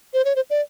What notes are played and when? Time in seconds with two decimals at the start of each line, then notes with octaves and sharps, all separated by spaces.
0.14 C5
0.25 C#5
0.36 C5
0.50 D5